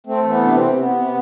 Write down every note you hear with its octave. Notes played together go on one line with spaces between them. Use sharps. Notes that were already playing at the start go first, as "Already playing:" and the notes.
A3 C4
E3 C4
B3
C3 D4
C4
C3
C3 B3
C3